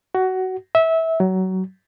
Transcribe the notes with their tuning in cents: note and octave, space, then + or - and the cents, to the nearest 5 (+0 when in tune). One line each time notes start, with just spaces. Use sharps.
F#4 +15
E5 -20
F#3 +20